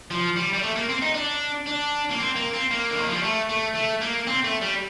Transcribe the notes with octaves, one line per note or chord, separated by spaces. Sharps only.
F3
G3
G3
A3
A#3
C4
D#4
D4
D4
A#3
C4
A#3
C4
A#3
D3
D#3
F3
G3
A3
A3
A3
A#3
C4
A3
G3